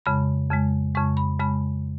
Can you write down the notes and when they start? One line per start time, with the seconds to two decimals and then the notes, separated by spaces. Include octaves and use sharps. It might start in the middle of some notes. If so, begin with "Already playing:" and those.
0.06 F2 C#3 G#3 B5
0.50 F2 C#3 G#3
0.95 F2 C#3 G#3 C#6
1.17 B5
1.39 F2 C#3 G#3 B5